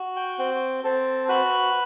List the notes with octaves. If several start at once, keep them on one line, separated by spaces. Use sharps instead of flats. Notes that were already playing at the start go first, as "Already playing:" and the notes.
Already playing: F#4
G5
C4 G5
C4 A4
F#4 B4